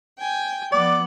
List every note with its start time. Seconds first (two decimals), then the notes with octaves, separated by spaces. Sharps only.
0.19 G5 G#5
0.72 F3 B3 D5 F#5 D6